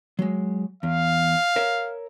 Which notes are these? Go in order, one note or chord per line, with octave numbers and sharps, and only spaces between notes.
F#3 G#3
E2 F5
A#4 C#5 E5